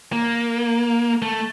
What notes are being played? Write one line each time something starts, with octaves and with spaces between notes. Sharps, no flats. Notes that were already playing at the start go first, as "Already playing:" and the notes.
A#3
A3